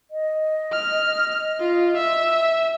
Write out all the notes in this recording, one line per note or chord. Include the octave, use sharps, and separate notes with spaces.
D#5
F6
F4
E5